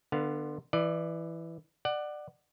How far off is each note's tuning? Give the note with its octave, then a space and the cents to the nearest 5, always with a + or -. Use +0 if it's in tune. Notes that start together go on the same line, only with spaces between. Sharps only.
D3 +25 B3 +0 F5 +0
E3 +0 D5 +25
D5 +25 F#5 +10